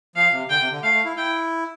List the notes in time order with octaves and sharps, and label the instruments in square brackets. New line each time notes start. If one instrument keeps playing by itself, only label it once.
[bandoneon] F3 [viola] F5
[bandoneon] C3
[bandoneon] D3 [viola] G5
[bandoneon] C3
D3
[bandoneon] A3 [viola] F5
[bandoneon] A3
E4
[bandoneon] E4 [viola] G5